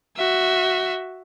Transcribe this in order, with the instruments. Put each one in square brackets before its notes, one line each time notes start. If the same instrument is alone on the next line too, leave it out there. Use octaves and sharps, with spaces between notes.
[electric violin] F#4 E5